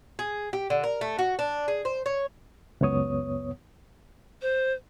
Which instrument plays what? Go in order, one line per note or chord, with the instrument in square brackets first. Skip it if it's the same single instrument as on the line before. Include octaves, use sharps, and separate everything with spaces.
[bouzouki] G#4
G4
D3
A#4
A3
F#4
D4
G#4
C5
C#5
[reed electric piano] C#2 F#2 B3 C#5 D#6
[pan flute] C5